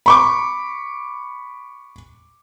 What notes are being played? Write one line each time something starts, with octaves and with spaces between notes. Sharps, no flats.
B5 C#6 D6